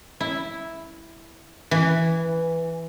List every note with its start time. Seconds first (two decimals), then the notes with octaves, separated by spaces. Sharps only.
0.20 E4
1.71 E3